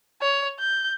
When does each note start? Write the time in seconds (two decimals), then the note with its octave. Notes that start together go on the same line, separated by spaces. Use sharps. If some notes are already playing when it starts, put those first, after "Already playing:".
0.22 C#5
0.59 G6